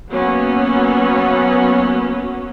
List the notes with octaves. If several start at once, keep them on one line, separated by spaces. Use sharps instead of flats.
F#3 A#3 B3 C#4 F#4